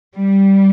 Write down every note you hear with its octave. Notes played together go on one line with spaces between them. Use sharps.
G3